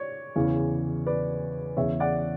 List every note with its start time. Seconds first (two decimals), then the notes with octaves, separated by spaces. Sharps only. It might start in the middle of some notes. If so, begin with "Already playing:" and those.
Already playing: C#5 D5
0.36 E2 C#3 E3
1.06 B4 D5
1.77 E2 C#3 E3 C#5 E5
2.00 D5 F#5